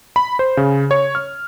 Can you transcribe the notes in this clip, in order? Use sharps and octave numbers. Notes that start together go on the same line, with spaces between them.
B5
C5
C#3
C#5
F6